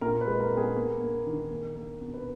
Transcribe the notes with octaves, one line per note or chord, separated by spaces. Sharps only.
A#2 A#4
B4
G#3
A#4
B3
G#4
A#3
A#3
D#3
A#3
A#3
B2
B4